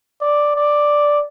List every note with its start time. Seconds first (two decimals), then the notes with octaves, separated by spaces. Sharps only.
0.21 D5
0.56 D5